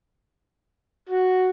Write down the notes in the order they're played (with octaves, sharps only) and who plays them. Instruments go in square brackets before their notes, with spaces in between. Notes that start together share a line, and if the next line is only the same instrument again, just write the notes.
[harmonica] F#4